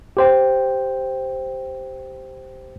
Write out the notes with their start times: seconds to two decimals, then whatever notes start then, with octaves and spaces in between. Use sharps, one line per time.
0.17 G4 C5 G5